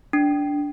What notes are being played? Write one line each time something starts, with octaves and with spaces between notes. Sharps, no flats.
D4